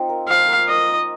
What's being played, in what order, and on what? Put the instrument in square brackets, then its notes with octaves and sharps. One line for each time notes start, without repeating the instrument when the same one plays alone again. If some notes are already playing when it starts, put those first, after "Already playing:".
Already playing: [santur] C4 D#4 F4
A#4
[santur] F3 [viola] F5
[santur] A#3
[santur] A#3 [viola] D#5
[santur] D#4